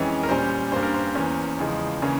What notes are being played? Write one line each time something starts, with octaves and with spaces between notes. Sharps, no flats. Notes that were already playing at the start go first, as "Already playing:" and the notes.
Already playing: F2 E3 G#3 C#4
A#4
A#2 G3 C#4 C5
G2 G3 A#3 C#4 C5
A#4
C5
E2 E3 A#3 C#4
E2 C#3 F3 G#3
C#3 E3 A#3 C#4